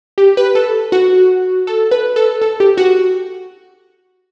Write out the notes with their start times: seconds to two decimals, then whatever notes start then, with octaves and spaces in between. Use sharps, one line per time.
0.18 G4
0.37 B4
0.55 A4
0.92 F#4
1.67 A4
1.91 B4
2.16 A4
2.41 A4
2.60 G4
2.77 F#4